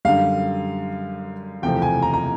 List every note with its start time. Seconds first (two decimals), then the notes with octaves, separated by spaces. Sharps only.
0.05 F#2 D3 G3 F5
1.62 F#1 E2 C3 F3 A3 G5
1.82 G#5
2.02 A#5
2.14 A#5